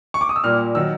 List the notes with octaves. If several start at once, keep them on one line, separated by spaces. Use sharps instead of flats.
C#6
D6
D#6
E6
A#2 G3 A#3 F6
D#3 F#3 E6